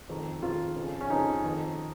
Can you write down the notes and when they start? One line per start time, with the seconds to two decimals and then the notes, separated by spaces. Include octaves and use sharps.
0.09 F2 D#3
0.42 F2 D#3 F4
0.76 F2 C#3
1.01 C#4
1.10 F2 C#3 D#4
1.44 F2 D#3